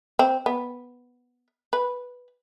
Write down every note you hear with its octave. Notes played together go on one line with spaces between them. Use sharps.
C4
B3
B4